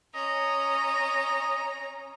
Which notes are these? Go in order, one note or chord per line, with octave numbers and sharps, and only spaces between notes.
C#4 D#5 A#5